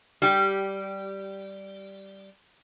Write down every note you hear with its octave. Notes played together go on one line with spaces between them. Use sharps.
G3 G4